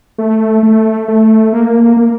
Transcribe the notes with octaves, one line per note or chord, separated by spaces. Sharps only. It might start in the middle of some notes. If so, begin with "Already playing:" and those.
A3
A3
A3
A#3
A#3